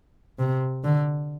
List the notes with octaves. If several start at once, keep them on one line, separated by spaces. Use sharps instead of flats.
C3
D3